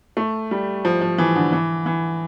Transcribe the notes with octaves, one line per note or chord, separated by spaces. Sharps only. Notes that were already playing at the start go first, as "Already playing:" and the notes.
A3
G3
F3
F3
E3
D3
E3
E3